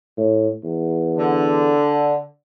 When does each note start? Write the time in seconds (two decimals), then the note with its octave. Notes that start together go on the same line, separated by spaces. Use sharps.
0.17 A2
0.64 E2
1.17 D3